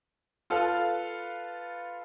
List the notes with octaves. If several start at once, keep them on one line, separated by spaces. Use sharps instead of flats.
F4 A4 B4 F5